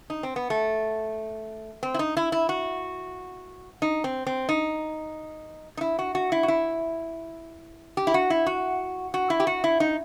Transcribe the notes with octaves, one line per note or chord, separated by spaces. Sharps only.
D#4
C4
B3
A3
C4
E4
D#4
E4
E4
F#4
D#4
C4
C4
D#4
D#4
E4
F#4
F#4
E4
F#4
E4
G4
E4
F#4
E4
F#4
F#4
E4
G4
F#4
E4
D#4